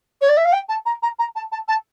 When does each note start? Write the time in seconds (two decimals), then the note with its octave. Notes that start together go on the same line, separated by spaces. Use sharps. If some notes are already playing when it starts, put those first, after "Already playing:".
0.21 C#5
0.29 D5
0.37 E5
0.45 F5
0.52 G5
0.69 A5
0.85 A#5
1.02 A#5
1.19 A#5
1.35 A5
1.52 A5
1.68 A5